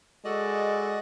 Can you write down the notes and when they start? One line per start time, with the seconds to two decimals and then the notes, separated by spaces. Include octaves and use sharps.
0.25 G#3 F#4 A4 D5 D#5